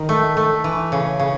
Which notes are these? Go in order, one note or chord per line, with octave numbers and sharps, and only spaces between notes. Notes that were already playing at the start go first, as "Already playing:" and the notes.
Already playing: D#3
A3
A3
E3
C#3
C#3